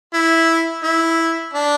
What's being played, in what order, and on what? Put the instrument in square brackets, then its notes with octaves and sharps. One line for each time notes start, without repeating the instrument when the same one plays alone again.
[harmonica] E4
E4
D4